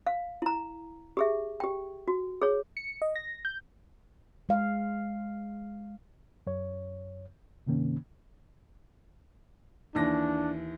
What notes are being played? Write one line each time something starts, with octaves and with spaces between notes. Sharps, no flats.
F5
E4 A#5
G4 G#4 E5
G4 G5
F#4
G#4 C#5
C#7
D#5
A#6
G6
G#3 F5
F#2 C#5
G2 C3 D#3 A#3 C#4
D#2 E3 D4 A#6